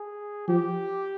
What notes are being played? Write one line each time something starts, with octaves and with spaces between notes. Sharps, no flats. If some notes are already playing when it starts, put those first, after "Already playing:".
Already playing: G#4
F3 G4